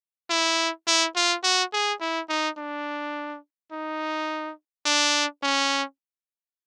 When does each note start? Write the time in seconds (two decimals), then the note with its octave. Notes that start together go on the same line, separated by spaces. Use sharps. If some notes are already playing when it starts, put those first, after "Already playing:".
0.30 E4
0.87 E4
1.16 F4
1.44 F#4
1.73 G#4
2.01 E4
2.29 D#4
2.58 D4
3.72 D#4
4.86 D4
5.43 C#4